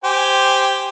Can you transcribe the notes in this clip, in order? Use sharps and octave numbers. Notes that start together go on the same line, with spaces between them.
G4 C5 G#5